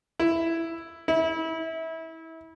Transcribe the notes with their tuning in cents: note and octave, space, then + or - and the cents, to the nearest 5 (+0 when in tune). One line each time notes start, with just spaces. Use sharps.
E4 +5
E4 -25